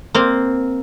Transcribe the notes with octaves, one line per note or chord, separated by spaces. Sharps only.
A#3 C4